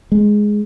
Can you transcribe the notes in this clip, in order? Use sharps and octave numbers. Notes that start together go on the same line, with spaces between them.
G#3